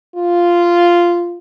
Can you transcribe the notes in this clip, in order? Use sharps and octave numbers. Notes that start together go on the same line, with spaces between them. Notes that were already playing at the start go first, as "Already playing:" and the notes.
F4